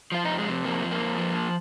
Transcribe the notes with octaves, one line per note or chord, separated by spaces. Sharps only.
F3 F4
D#4
F2
G#3
C3
F2 A#3
F3
A#3
F2
F3